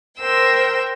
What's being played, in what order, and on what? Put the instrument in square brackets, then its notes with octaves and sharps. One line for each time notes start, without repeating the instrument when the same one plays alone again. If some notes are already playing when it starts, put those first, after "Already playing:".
[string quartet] A#4 C5 G5 E6